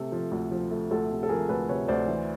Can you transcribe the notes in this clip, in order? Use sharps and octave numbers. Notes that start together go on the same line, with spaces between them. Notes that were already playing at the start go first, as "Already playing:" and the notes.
Already playing: C3 A3 A4
F3
D2
F3
A3
D2 A4
C3
A4
F3 G#4 A#4
D2 A4 B4
C3 B4 C#5
D2 C5 D5
E3